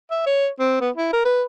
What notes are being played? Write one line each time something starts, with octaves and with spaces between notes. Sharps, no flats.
E5
C#5
C4
B3
E4
A#4
B4